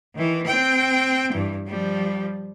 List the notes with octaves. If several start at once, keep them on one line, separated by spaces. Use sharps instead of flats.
D#3 E3
C4 G5
G2 E3
F3 G3